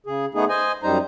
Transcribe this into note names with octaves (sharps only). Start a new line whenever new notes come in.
C#3 G#4
A3 B3 D#4 G#4
C5 D#5 G#5
F#2 G3 D#4 C5 A#5